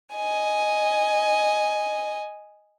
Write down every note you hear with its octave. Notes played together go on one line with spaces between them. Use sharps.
D#5 G#5